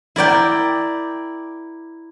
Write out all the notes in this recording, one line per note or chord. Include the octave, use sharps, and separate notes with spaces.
E4 A#4 D5 G5